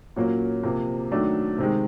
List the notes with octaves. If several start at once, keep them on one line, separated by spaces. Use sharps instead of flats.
A#2 F#3 A#3 C#4
C3 F3 A#3
D#3 F#3 A3 D4
C3 D#3 G#3